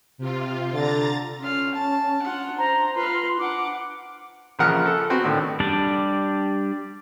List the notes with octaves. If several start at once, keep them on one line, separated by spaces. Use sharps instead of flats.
C3 F4
D3 A#5 A6
C#4 F4 F5
A5
D4 F4 F#5
C5 A#5
F4 B4 F5 C6
D4 F#5 D6
A#1 C#3 F3 A#4 F#5 F6
A4
B3 C4 F#4
A2 D3 D#3
G3 D4 G4 D5